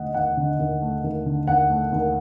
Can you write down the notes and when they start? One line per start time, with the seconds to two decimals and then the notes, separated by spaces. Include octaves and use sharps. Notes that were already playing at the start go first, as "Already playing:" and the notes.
Already playing: D#2 D3 A3 D#5 F#5
0.14 D#2 F#5
0.37 D3
0.59 D#2
0.82 A3
1.04 D#2
1.26 D3
1.48 D#2 F#5
1.70 A3
1.92 D#2